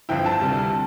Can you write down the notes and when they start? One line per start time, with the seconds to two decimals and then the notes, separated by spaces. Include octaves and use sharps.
0.09 G1 G2 F3 C4 E4 G5
0.26 A5
0.41 D2 C3 G3